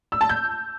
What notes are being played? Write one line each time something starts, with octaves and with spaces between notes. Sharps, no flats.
E6
A5
G6